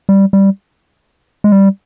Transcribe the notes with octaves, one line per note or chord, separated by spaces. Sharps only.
G3
G3
G#3
G3